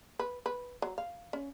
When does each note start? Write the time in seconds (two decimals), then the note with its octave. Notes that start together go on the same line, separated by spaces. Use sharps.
0.19 B4
0.46 B4
0.82 F#3
0.98 F5
1.33 C#4